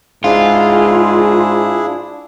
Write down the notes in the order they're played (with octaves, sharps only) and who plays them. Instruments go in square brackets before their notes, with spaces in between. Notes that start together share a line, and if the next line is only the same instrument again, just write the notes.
[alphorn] G#2 [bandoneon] D4 E4 G#4 [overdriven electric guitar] F4